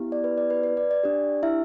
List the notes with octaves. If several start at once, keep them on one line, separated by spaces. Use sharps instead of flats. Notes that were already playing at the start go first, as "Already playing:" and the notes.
Already playing: B3 E4 G4
D5
B4
D5
B4
B4
D5
D5
D4 G4
E4 E5